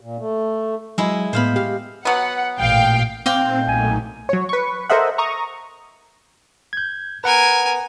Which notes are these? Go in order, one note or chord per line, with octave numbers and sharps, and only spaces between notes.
A#2
A3
F#3 G#3 E4
A2 B3 C5 F5 B5
G4 F5
F#3 B3 F#5
A1 A#2 F5 G5
A#2 A3 C4 D#4 F5 G5 D6
B1 G#5
F#3 C#5
B4 C#6
A4 A#4 C5 D#5 E5 F#5
A#5 C#6 D#6
G6 G#6
A#4 B4 F#5 G#5